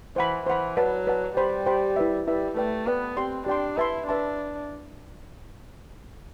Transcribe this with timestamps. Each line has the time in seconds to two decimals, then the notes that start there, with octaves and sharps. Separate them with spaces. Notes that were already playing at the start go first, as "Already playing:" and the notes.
0.16 E3 C5 F#5 B5
0.46 E3 C5 F#5 B5
0.77 F#3 B4 D5 F#5 A5
1.07 B4 D5 F#5 A5
1.37 G3 G4 C5 G5 B5
1.66 G4 C5 G5 B5
1.96 E4 B4 E5
2.27 G3 E4 B4 E5
2.57 A3 B4 D5 G5
2.87 B3 B4 D5 G5
3.17 C4 G4 D5 G5 C6
3.46 D4 G4 D5 G5 C6
3.77 E4 B4 E5 A5 C6
4.07 D4 B4 E5 A5 C6